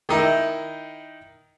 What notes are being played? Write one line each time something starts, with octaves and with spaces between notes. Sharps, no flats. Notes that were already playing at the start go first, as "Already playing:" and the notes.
D#3 D#4 E4